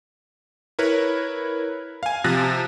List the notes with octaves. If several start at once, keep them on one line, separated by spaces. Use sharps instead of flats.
E4 A#4 B4 C#5
F5 G#5
C3 F3 F#6 A6 A#6